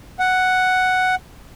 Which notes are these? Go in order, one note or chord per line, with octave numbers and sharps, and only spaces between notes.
F#5